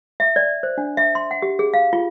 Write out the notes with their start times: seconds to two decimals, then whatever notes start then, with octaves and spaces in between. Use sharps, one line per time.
0.20 E5
0.36 D5
0.63 C5
0.78 D4
0.97 E5
1.15 C6
1.31 F#5
1.42 G4
1.59 G#4
1.74 F5
1.93 F4